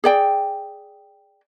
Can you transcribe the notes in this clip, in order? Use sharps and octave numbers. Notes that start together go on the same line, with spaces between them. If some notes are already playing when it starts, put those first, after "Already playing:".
G#4 D5 G5